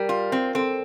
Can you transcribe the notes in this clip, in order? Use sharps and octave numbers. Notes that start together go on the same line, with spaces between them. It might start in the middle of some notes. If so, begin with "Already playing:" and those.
Already playing: G3 A#4
F4
C4
C4 A4